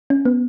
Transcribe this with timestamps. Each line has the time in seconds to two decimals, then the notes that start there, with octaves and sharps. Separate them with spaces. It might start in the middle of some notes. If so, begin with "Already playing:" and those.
0.10 C#4
0.25 B3